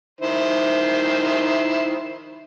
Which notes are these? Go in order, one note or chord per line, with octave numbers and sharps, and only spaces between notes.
D#3 E4 C5